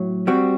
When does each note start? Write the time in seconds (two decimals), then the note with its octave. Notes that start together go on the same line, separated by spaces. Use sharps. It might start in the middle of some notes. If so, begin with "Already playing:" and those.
Already playing: A2 F#3
0.27 G3 C4 F#4